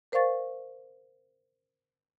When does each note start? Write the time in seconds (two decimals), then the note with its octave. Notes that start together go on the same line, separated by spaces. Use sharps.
0.12 A#4 C5 D5 F5 C#6 A6